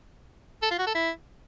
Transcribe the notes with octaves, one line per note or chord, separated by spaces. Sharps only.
A4
F4
F#4
A4
E4